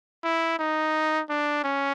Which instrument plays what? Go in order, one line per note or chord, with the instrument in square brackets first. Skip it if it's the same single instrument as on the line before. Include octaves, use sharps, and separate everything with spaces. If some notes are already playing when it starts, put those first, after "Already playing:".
[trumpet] E4
D#4
D4
C#4